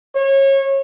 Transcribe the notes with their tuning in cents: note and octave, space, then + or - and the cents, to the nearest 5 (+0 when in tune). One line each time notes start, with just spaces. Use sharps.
C#5 -25